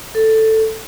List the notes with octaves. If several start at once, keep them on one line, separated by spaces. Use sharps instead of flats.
A4